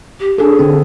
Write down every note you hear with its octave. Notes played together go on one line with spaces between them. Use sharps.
G4
D4 G#4 A4
D3 C4